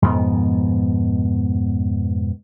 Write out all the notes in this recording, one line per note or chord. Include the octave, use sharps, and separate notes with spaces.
F2 G#2 B2 B3